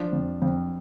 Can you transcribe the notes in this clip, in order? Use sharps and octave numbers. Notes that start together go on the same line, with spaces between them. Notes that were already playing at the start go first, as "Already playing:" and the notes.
Already playing: F3 D4
F2
F2